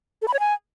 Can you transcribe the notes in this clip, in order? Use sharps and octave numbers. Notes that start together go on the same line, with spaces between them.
A4
B5
C#5
G#5